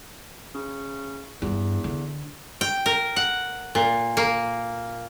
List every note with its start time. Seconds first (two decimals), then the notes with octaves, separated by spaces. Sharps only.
0.55 C#3
1.42 E2 G2
1.84 D3
2.61 G5
2.86 A#4
3.16 F#5
3.75 A#2
4.17 A#3